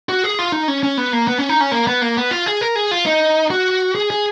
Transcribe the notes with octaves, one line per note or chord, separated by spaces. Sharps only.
F#4
G#4
F4
D#4
C#4
C#4
B3
A#3
B3
C#4
D#4
C#4
A#3
B3
A#3
B3
F4
G#4
A#4
G#4
F4
D#4
F#4
G#4
G#4